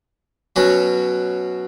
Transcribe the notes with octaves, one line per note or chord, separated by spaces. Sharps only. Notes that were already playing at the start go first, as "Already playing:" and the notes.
B2 F#3 C#4 F#4